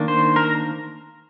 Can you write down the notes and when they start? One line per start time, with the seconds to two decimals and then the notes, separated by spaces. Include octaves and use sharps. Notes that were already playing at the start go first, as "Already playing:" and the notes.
Already playing: D#3 A#3 D4
0.08 C5
0.36 A#4